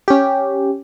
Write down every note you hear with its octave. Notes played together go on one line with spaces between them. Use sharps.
C#4 G4